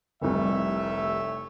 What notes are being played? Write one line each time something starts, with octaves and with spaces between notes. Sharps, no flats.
F1 C2 A3 C#5 E5